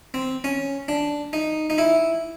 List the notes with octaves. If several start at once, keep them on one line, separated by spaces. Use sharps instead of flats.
C4
C#4
D4
D#4
D#4
E4